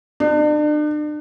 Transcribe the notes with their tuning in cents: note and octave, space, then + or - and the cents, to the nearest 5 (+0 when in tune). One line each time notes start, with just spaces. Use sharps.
D4 +40